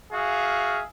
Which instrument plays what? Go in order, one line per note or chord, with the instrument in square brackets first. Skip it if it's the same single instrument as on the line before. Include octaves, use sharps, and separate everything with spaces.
[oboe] F#4 [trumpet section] G#4 E5 F5